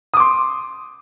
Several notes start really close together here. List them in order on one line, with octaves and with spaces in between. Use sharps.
D#6 D6 C6